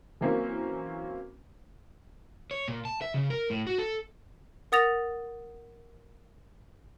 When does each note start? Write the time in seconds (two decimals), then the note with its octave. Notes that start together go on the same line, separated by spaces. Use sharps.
0.21 E3 F#3 A#3 C4 C#4
2.51 C#5
2.68 A#2
2.85 A5
3.02 E5
3.14 C#3
3.30 A#4
3.50 A2
3.67 F#4
3.78 A4
4.72 A#4 F#5 D#6 A6 A#6 F7